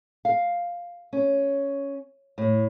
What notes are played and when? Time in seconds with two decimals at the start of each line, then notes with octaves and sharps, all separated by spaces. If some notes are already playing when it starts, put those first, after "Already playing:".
0.25 F5
1.13 C#4
2.38 A2